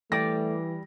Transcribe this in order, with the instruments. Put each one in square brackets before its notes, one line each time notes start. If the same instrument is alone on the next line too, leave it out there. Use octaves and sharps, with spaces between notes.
[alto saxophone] E3 [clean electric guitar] G3 G4 D5 [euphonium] A3 [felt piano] A#6